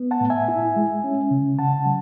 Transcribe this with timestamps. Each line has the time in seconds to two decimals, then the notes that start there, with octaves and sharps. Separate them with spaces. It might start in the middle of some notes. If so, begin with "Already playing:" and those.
Already playing: B3
0.11 F#5 A5
0.21 A2
0.30 E5 G#5
0.48 E4
0.76 G#3
1.04 C#4
1.31 C#3
1.59 C#3 F#5 A5
1.86 F#3